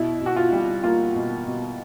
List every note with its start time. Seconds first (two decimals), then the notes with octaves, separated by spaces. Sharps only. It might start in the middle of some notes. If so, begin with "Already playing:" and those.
Already playing: B2 E4
0.21 B2
0.26 F#4
0.36 F4
0.52 G3
0.84 A#3 F4
1.15 B2
1.47 B2